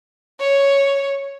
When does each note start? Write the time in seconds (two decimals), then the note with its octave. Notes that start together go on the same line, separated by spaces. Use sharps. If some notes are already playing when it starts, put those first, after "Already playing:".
0.40 C#5